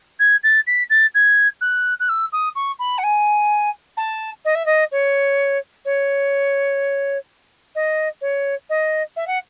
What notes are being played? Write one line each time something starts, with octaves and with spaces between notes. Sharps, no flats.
G#6
A6
B6
A6
G#6
F#6
F#6
E6
D#6
C#6
B5
F#5
G#5
A5
D#5
E5
D#5
C#5
C#5
D#5
C#5
D#5
E5
F#5